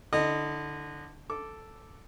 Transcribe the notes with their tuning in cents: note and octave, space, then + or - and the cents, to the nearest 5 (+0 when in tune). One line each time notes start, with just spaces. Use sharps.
D3 +0 E4 -40 D#5 -20
A4 +0 D6 -5